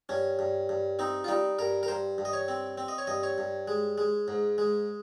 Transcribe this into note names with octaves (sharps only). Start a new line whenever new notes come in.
G2 C#4
G2
G2
C4 D#4
F4
G3 D#4
G2 A#4
A#4
G2 C5
G2
D#5
C#5
C4
C4
D#5
C#5
G2 D#5
C#5
G2
G#3
G#3
G#2
G#3